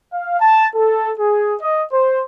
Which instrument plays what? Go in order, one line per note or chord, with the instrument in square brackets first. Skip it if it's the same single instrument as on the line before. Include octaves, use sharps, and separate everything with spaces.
[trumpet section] F5
A5
A4
G#4
D#5
C5